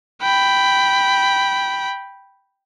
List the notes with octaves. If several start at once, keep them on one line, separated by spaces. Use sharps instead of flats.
G5 B5